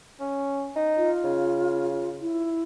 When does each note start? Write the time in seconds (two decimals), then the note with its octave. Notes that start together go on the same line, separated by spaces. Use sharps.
0.20 C#4
0.76 D#4
0.97 F4
1.24 C#3
2.21 E4